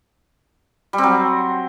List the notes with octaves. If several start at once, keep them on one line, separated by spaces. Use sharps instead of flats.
G3
C4
F#3